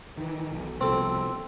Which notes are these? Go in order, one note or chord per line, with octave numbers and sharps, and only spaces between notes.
D#3 E3
B1
C2 B2 F3 C4 A4